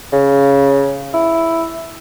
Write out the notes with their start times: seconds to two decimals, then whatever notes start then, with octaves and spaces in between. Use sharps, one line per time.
0.13 C#3
1.14 E4